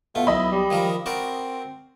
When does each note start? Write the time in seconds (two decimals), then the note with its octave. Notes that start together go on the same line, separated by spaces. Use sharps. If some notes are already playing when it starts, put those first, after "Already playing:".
0.15 B2 A3 F4
0.27 B1 E4 D#5 B5
0.51 G3
0.70 D#3 F3 A#4
1.06 C4 F#4 A#4 D5